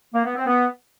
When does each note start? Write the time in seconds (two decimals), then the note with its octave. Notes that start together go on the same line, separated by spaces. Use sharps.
0.14 A#3
0.24 B3
0.35 C4
0.46 B3